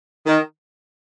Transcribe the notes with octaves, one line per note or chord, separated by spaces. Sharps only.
D#3